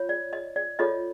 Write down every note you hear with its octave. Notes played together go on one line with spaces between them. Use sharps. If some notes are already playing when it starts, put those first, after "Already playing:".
Already playing: F4 C#5
D5
D#5
D5
F4 A4 C#5 D#5